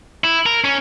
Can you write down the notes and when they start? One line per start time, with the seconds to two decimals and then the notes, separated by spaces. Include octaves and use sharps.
0.24 E4
0.46 A#4
0.64 C#4